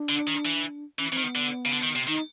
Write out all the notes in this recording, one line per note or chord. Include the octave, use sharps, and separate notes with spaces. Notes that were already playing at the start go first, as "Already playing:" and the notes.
Already playing: D4
D3
D#3
E3
E3 C#4
E3 C4
D#3
B3
D3
C#3
D3
D#3
C3
D#3 D#4